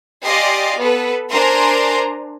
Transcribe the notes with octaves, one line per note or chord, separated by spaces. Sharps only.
G4 D5 D#5 F5 G#5 C6
B3 A4 B4
D4 A#4 C5 G#5 A#5 C6